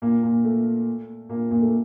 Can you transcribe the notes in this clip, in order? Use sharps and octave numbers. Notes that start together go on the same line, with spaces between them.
A#2 A#3
A#2 A#3
A3
A#2 A#3
A#2 A#3
A3